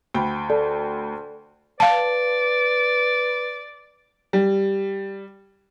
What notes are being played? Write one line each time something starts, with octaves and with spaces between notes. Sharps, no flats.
D2 G5 B5
A4 D5 A5
B4 D5 F5 A5
G3